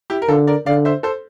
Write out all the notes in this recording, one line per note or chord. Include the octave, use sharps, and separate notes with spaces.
E4 G4
A#4
D3 F4 A4
A#4 D5
D3 D5 F5
C5 E5
A4 C5